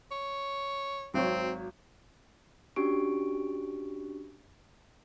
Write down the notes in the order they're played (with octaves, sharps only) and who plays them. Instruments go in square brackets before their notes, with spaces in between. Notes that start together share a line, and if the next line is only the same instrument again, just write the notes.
[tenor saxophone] C#5
[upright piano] G#1 F#3 C#5 [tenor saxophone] C4
[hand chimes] C#4 D4 F#4 G4 C#6 D7